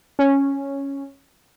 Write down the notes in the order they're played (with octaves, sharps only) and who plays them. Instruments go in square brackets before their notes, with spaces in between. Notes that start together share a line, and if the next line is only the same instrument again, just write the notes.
[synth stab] C#4